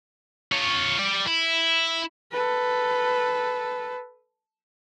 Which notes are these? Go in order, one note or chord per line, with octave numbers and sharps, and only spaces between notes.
F4 C#5
G3 D5
E4
A4 B4